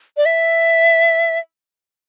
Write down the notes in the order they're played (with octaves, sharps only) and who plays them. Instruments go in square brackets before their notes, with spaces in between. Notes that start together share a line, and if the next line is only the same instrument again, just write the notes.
[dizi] D5
E5